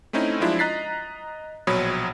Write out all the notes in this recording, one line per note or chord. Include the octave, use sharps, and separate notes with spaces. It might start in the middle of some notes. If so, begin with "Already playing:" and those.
A3 C4 C#4 D#4 E4
F3 F#3 G#3 D4 E4 F4
D#5 A#5 F#6 A6 B6 C7
A#1 B2 F#3 C#5 B5 D#6